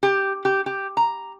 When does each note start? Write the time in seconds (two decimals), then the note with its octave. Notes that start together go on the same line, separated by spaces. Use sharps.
0.03 G4
0.45 G4
0.66 G4
0.97 A#5